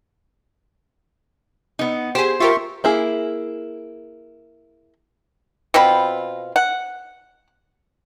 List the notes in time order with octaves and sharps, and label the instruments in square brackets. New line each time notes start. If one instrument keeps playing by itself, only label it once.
[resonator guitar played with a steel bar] B3 D#4
[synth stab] G4 G#4 [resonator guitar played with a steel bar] C5
[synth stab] F4 G4 A#4 [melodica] E5 C6 C#6
[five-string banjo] A#3 E4 G#4
[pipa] B2 C4 F4 B5
F#5